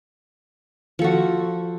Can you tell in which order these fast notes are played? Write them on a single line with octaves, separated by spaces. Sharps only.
F3 A4 F#4